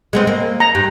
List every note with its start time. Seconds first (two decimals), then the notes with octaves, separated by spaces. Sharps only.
0.13 G#3 B3 C4
0.27 A#3
0.60 A#5
0.75 G2